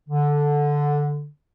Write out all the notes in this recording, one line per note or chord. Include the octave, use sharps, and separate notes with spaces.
D3